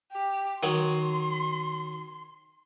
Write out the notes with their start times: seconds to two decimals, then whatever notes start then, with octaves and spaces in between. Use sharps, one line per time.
0.12 G4
0.63 D#3 F#3 C6